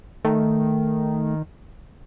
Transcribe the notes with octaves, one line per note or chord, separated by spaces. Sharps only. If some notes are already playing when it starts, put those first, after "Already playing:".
D#3 A3